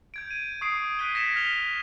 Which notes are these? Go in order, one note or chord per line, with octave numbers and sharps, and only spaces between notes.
G6 G#6 D7
D#7
C#6 D#6 C7 D7
F#6 G#6 B6 D7 D#7 G7
G#6 A#6 B6 C#7 E7
F6 B6 D7 F7 G7